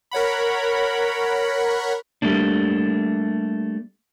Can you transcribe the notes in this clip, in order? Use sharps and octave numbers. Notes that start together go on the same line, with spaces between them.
A#4 C#5 F#5 B5
G3 A3 A#3 D4